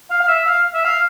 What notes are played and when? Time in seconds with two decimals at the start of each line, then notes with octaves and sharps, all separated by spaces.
0.11 F5
0.21 F5
0.28 E5
0.47 F5
0.74 E5
0.85 F5